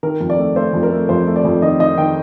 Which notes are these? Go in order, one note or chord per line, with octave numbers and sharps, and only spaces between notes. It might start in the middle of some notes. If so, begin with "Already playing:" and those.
D#3 A#4
F2
D5
A3
A3 C5
F2
A#4
A3
F2 C5
A3
D5
F2
D#3 D#5
D#3 D#5
D#3 G5